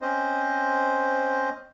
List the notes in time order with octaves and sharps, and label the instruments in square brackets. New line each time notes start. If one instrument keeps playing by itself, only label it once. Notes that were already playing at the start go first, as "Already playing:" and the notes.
[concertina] C4 C#4 C5 D#5